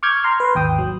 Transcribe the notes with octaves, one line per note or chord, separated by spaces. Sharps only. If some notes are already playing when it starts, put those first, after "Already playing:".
C#6 D6 F6 G6 G#6
A#5 C6 F6
B4 C6
G#1 D#2 G5 D#6
F#3